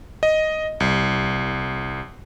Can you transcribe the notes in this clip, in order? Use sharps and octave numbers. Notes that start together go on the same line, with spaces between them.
D#5
C2